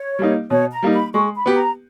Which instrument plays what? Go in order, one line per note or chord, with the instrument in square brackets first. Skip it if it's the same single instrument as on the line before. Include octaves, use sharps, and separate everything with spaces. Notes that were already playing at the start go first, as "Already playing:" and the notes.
Already playing: [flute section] C#5
[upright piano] G3 A#3 D#4
[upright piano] B2 [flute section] C#5
[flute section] A#5
[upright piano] G3 A#3 D#4
[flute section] B5
[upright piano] G#3 [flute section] C#6
[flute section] B5
[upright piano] B3 G4
[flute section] A#5